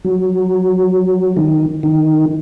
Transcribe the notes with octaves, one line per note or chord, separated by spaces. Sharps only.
F#3
D#3
D#3